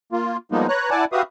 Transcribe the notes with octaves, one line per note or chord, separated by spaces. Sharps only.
A#3 F4
F3 G3 G#3 A#3 B3 D#4
B4 C#5 A#5 F#6
E4 D5 F#5 G#5 A5 D6
F#4 G4 B4 E5 F5 D#6